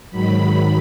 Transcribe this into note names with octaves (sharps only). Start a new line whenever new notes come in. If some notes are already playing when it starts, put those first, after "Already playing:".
G#2 D#3 F#3 B5